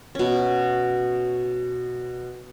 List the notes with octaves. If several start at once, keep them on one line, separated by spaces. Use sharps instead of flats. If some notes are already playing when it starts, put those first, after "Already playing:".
B2 C#4